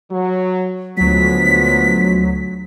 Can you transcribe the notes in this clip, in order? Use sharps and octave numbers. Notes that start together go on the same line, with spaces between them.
F#3
D2 F3 F#3 G#3 B3 B6